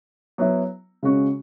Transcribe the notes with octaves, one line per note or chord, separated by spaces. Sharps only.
F#3 B3 E4
C#3 G#3 C#4 F#4